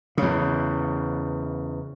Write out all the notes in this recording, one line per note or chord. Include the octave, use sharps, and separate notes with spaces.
E2 C#3